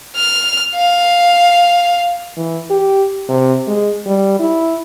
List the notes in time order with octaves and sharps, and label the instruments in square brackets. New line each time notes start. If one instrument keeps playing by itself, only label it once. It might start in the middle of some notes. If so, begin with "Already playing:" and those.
[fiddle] F6
F5
[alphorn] E3
G4
C3
G#3
G3
E4